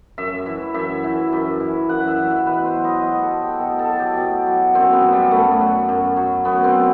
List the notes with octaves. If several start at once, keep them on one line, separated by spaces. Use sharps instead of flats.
F#2 E5
E3
F#2 E5
E3
F#2
E3
F#2 F#5
E5
E3
E5
B2 B4
C5
F#3
D#5
B2 D#5
A4
F#3
G4
B2 A4
A4
F#3
G4
B2
F#3
F#2 C4
B3
F#3
G3
F#2 A3
F#3
F#2
F#3
F#2 B3
C4
F#3